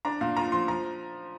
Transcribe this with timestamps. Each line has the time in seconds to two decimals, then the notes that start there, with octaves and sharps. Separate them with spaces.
0.05 D4 A#5
0.21 A#2 F5
0.37 F4 A#5
0.52 F3 C6
0.68 F3 A#5